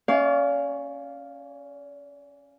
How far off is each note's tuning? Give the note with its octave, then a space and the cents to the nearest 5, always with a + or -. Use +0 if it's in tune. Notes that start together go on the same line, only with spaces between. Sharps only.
C#4 +0 D5 -40 F5 +0